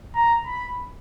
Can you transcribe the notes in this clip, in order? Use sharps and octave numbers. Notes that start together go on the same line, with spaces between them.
A#5
B5